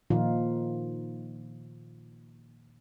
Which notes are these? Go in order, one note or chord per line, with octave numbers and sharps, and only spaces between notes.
A#2 D#3 F3 D#4 F4